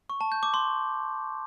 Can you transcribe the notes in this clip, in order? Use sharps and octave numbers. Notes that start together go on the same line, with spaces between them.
C#6
A5
G6
D6
C6